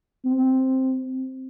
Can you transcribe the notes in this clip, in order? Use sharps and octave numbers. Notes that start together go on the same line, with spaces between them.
C4